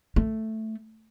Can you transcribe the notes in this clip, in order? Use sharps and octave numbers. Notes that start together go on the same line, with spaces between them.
A3